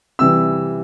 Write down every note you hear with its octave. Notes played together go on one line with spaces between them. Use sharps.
C3 E3 G3 E6